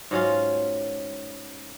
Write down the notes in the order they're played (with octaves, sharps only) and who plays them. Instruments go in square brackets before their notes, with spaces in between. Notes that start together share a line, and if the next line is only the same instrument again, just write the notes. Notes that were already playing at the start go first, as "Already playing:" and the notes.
[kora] G#2 F#3 C#4 F4